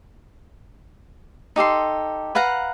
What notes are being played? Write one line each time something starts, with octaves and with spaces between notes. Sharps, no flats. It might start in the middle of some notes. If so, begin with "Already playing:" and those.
D#4 G4 A4 C6
B4 F5 F#5 A#5